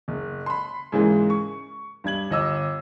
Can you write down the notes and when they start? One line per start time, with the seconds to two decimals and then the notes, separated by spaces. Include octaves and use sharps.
0.08 F#1
0.46 B5 C6
0.92 G#2 C#3 E3 G#3 A#3
1.30 C#6
2.04 G2 G3 G#6 F#7
2.31 G1 D#5 E6